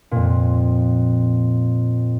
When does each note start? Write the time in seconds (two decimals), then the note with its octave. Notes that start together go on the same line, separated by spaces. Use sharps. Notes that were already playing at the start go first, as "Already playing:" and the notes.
0.11 F2 A#2